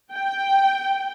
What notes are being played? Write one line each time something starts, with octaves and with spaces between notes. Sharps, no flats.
G5